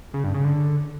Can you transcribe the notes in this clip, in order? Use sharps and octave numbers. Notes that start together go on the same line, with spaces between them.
C#3
G2
C#3
D3